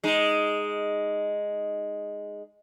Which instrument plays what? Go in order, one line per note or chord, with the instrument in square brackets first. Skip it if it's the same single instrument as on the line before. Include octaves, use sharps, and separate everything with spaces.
[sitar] G#3 D#4